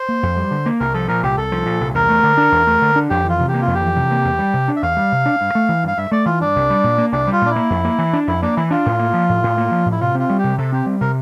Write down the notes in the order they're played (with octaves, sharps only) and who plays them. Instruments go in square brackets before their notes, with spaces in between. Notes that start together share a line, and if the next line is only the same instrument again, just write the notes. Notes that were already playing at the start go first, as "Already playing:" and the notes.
Already playing: [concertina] C5
[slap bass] A#3
F2
G3
D3
A#3
[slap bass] C2 [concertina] A#4
[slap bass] F3 [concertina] A4
[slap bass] A#2 [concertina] A#4
[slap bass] C2 [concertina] G4
[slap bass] C2 [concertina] A4
[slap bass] F3
A#2
C2
[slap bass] E2 [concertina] A#4
[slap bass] A3
D3
D4
E2
A3
D3
D4
[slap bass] F2 [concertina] G4
[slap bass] E3 [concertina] F4
[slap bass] C3
[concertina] G4
[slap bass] A#3
[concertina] F4
[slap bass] F2
[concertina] G4
[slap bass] E3
C3
A#3
E2
G3
C3
D4
[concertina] E5
[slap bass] E2 [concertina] F5
[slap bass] G3
C3
D4
G2
A3
E3
[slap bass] G2 [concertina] F5
[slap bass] G2 [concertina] E5
[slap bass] A3 [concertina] D5
[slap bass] E3 [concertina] F4
[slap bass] G2 [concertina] D4
[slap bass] C2
G3
A#2
A#3
[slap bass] C2 [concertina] D4
[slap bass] G3
[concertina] F4
[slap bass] A#2 [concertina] D4
[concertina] E4
[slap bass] A#3
F2
A#3
E3
D4
[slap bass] F2 [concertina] E4
[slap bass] A#3 [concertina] D4
[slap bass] E3 [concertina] E4
[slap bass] D4 [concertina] F4
[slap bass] A2
A#3
F3
A2
A2
A#3
F3
A2
[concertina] E4
[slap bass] C3 [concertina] F4
[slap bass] C4 [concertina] F4
[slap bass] G3
[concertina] G4
[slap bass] C3
[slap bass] C3 [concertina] A4
[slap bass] C4 [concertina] G4
[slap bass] G3
[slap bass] C3 [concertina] A#4